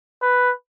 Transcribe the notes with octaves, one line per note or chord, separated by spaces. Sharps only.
B4